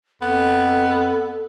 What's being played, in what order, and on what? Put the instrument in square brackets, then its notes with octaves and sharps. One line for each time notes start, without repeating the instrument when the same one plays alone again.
[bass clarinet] F2 [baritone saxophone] B3 [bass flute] A4